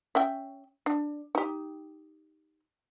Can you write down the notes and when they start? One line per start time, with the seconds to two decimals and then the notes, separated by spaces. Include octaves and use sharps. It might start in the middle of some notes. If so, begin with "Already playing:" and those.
0.15 C#4 E5 G5
0.86 D4
1.35 D#4 G4